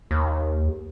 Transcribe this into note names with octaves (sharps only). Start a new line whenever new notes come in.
D#2